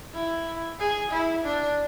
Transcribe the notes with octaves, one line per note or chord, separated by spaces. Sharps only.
E4
G#4
E4
D4